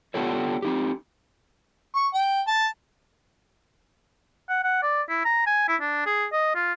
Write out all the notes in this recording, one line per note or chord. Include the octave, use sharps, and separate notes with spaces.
B3 D4 F4 G4 A4 C#5
C4 D#4 G4
C#6
G5
A5
F#5
F#5
D5
E4
A#5
G#5
E4
D4
G#4
D#5
F4